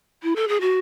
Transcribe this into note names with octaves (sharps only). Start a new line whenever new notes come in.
E4
A4
G#4
F#4